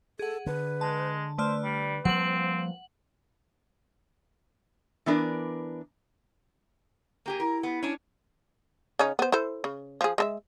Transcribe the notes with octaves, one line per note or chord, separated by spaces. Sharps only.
G#4 A4 F#5
D3 B4
G#3 A5
A3 B4 C5 D5 F6
G3
F3 G3 A#3 C4 F#5 F#7
E3 B3 D4 A#4 D5
A#3 G4 G#4
E4 A#4
B3
C#4 D4
C#3 C#4 D#4
B3 C5
E4 A4 C5
C#3
F3 G#4
G#3 A4 E5